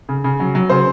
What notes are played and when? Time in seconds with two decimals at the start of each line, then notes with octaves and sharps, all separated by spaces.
0.09 C#3
0.24 C#3
0.40 F#3
0.55 F#3
0.70 C#3 C5